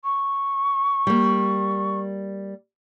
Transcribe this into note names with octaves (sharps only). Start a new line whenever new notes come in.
C#6
G3 A#3